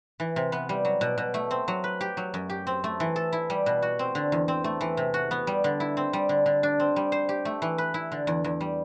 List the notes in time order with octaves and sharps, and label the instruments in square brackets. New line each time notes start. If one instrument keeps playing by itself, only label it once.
[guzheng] E3
C3
B3
G3
F#3
B2
B2
A3
C4
F#3
B4
G4
F#3
F#2
G4
C4
A3
E3
A4
E4
G3
B2
F#4
C4
D3
E2
C4
A3
E3
C3
F#4
B3
G3
D3
E4
C4
G3
D3
D3
D4
C4
G3
C5
G4
A3
E3
B4
E4
D3
E2
E2
G3